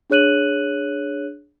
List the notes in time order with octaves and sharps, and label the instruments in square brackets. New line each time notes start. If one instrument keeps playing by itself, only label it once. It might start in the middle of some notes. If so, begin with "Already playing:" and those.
[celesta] D4 G#4 C#5 F#6 D#7 F#7